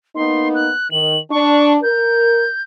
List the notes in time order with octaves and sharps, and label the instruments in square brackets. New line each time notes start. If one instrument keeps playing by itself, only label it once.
[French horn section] A#3 B3 D#4 [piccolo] C6
[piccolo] F#6
[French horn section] D#3 [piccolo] F#7
[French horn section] D4 [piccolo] C#6
[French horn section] A#4 [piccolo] G6